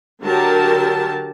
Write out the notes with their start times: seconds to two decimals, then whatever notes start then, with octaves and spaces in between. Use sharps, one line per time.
0.21 D3 F#3 G4 A#4 A5